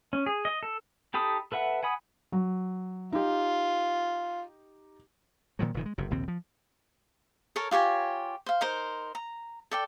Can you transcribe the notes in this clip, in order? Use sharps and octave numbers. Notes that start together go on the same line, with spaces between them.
C#4
G#4
D#5
A4
D#4 G4 A4 B5 D#6
A4 B4 E5 F#5
F#5 G#5 B5 D#6
F#3
D#4 F4 G4
A#2 D#3 F3 F#3
F1 A#2 D#3 E3
G#3
F#1 C3
A#1 D#2 C3 C4
F3
A4 A#4 C#5 A5
F4 G4 C#5 G#5
C5 F5
D#4 A#4 C5
A#5
A4 D5 G5